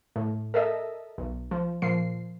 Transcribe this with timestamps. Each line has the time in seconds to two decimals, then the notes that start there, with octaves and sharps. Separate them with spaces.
0.16 A2
0.54 A4 A#4 D#5 E5
1.18 B1
1.51 F3
1.82 A#2 F3 C7